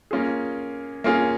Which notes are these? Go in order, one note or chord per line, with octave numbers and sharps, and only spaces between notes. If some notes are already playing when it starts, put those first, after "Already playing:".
A#3 C#4 F4 G#4
A#3 C#4 F4 G#4